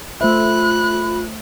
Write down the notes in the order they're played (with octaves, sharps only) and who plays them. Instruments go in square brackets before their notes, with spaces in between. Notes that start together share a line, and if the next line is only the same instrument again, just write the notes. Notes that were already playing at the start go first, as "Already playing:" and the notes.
[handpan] A3 C5 E5 [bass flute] F4 [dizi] B5 [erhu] F#6